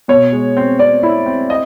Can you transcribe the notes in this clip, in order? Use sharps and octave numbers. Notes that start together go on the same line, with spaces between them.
B2 C#5
G#3
C4
C4 D5
E4
C4
D#5